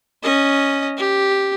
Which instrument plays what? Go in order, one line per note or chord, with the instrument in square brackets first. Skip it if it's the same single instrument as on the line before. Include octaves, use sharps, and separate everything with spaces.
[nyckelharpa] C#4 D#5
G4